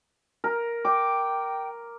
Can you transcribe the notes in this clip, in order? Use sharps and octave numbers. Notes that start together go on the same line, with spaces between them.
A#4
G5 D6